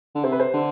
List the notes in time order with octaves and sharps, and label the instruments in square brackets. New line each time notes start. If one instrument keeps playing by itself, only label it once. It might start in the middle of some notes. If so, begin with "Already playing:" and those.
[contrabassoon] D3
[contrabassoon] C3 [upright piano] C5
[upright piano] B4
C5
[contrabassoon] D3